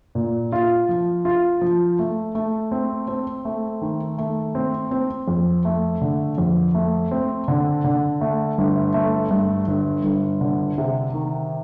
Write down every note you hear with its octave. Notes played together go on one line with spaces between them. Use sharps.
A#2
F4
F3
F4
F3
A3
A3
C4
C4
A3
D#3
A3
C4
C4
F2
A3
D3
F2
A3
C4
D3
D3
A3
G1
A3
G2
G1
G1
D3
C3
D#3